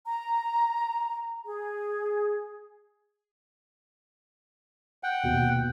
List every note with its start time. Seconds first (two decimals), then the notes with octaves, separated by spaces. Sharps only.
0.07 A#5
1.46 G#4
5.03 F#5 G5
5.24 D#2 B2